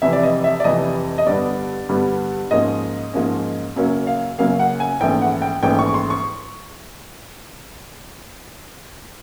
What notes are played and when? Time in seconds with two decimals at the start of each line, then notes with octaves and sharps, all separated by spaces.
0.02 F1 F2 C3 E3 E5
0.13 D5
0.23 D#5
0.44 E5
0.60 D5
0.64 F1 F2 C3 E3 D#5
1.18 D#5
1.26 G2 D3 G3 B3 D5
1.89 G2 D3 G3 B3
2.51 G#2 F3 A#3 C#4 D#5
3.13 G#2 F3 A#3 C#4
3.76 F#2 C#3 F#3 A#3 C#4
4.07 F5
4.38 F#2 C#3 F#3 A#3 C#4 F5
4.59 F#5
4.80 G#5
5.00 A#1 G#2 E3 A3 C#4 G5
5.22 F#5
5.42 G5
5.63 A#1 G#2 E3 A3 C#4 G5
5.79 C#6
5.94 C6
6.10 C#6